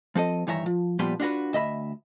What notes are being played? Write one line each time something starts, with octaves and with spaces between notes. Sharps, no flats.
F3 C4 A4 D#5
G2 D#3 E3 C#5 E5 A#5
F3
A#2 F3 G3 B3 B4 C6
D4 F4 F#4 B4
D2 D#5 E5 B5